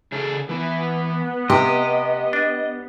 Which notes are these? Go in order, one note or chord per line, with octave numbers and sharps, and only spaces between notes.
C#3 G#4 A4
E3 B3 E4
C3 G4 D#5
D4